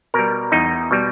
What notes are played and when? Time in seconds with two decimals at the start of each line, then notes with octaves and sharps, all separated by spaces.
0.14 B2 G3 A#4
0.52 E2 D#4
0.91 B2 G3